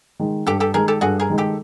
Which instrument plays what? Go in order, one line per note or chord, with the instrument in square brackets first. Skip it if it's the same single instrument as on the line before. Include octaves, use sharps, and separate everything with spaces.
[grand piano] D#3 G#3
[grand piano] G2 [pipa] G4 A4
[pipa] G4 A4
[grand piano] D#3 G#3 [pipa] G#4 A#4
[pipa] G4 A4
[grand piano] G2 [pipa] F#4 G#4
[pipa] G#4 A#4
[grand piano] D#3 G#3
[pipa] G4 A4